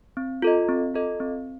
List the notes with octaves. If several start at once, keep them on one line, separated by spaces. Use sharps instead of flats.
C4
F4 A4 D#5
C4
F4 A4 D#5
C4